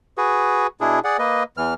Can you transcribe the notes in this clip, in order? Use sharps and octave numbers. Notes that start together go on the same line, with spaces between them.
F#4 G#4 B4
B2 D4 E4 G#4
G#4 D5 F#5
A#3 B4 D#5
E2 E3 F6